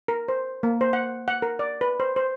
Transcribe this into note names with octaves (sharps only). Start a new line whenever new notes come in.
A#4
C5
A#3
C5
F#5
F#5
A#4
D5
B4
C5
C5